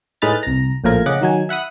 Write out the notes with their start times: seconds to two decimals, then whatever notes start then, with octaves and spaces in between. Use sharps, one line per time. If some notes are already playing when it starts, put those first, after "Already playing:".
0.22 A2 G#3 D#4 B4 F6 A6
0.43 C2 A#5
0.84 A#1 A2 F3 A#4 G#6
1.06 C#3 D#5 F#5 D6
1.21 D#3 F#3 G#5
1.49 E5 F#5 B5 D#6